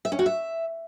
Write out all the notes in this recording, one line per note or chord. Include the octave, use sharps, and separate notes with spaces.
E5
C#4
F#4
E5